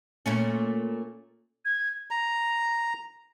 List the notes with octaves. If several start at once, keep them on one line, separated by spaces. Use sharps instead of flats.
A#2 A3 C#4
G#6
A#5